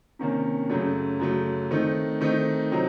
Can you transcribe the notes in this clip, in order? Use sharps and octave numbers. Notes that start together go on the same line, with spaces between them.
C3 D#3 A#3 C#4
F#2 C#3 F#3 A3
F#2 C#3 F#3 A3
D#3 A3 C4 D#4
D#3 A3 C4 D#4
C3 F#3 C4 D#4